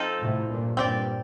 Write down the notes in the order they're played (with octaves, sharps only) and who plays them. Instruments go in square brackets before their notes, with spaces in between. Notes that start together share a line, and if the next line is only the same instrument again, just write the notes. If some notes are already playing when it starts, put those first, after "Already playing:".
Already playing: [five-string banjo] F3 C4 D#4 A4
[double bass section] A2 C3
G2 A#2
[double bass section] G2 A#2 [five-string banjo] C4 G4 D5